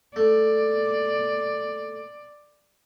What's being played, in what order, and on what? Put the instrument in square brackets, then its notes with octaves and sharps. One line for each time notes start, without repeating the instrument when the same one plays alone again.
[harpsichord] A3 [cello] D5